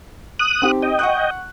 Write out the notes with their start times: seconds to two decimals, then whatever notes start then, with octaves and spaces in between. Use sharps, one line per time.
0.39 D#6 F#6
0.62 C4 D#4 G4
0.82 D#5 G5
0.99 F#5 C#6 F#6